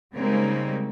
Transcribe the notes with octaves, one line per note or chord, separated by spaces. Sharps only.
C#3 G3 G#3 A#3 C4 D#4